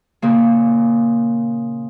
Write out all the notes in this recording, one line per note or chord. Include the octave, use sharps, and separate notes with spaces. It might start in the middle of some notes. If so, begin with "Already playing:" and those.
A#2 C#3 A#3